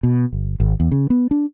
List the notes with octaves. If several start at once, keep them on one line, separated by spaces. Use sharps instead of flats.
B2
G1
G#1
E2
C#3
B3
D4